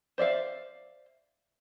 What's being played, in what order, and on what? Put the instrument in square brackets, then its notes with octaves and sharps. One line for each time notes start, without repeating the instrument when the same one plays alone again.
[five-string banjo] C5 D5 E5 F5